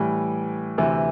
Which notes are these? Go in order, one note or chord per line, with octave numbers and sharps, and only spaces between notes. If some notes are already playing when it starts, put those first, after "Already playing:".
Already playing: A2 E3 G3
D2 C3 E3